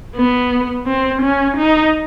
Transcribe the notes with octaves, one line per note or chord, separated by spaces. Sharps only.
B3
C4
C#4
D#4